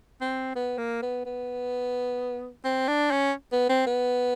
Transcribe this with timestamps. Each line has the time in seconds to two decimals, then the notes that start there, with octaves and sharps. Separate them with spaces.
0.21 C4
0.55 B3
0.78 A#3
1.02 B3
1.25 B3
2.64 C4
2.88 D4
3.11 C#4
3.52 B3
3.69 C4
3.86 B3